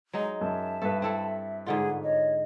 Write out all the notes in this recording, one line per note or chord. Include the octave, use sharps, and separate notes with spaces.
F#3 G#3 D#4
F#2 E5 A5
G2 A4 B4
C4 E4 A4
G#2 D3 F4 G#4 F#5
C#5 D#5